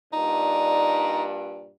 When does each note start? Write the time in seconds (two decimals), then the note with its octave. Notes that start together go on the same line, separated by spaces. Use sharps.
0.13 G2 A#2 D4 D#4